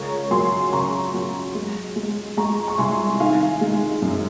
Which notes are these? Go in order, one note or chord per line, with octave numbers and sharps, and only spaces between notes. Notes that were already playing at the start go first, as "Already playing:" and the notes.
Already playing: C#2 A#4 C#5
F#3 G#5 C6
C#3 A#5 C#6
F#3
G#3
G#3
G#3 A#5 C#6
C#6
C2 G#5 C6
D#3 F5 G#5
G#3
F#2